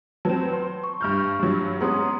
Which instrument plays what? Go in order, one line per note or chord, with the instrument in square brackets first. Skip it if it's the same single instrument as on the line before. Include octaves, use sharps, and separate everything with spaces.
[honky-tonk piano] F#3 C4 [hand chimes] B4 A5
[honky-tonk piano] C6
[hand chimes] C#6
[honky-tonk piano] G2 F6 G6
G2 F#3
[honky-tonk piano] G#3 B3 C#4 [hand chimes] A#5 C6 D#6